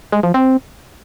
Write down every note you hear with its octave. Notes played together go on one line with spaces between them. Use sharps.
G#3
F3
C4